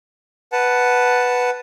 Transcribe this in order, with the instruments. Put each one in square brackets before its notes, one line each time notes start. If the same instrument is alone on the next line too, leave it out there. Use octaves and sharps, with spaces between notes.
[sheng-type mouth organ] B4 F#5 A5